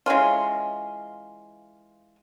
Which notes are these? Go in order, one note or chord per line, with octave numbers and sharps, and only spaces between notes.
E3 G#3 C#4 F4